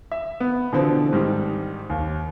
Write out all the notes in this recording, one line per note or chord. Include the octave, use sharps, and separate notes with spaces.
E5
B3
B2 D3 E3 F3 C4
G#2 D#3 G3
D#2